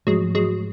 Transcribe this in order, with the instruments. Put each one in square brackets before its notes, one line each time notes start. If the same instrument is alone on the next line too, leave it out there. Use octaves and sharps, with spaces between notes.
[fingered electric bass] G#2 F3 A3 [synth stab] F#3 G#3
[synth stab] F#3 G#3